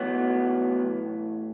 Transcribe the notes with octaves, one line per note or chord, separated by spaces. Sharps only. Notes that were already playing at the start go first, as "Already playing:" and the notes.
Already playing: A2 E3 F#3 B3